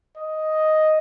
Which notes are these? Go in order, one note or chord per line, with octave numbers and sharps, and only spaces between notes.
D#5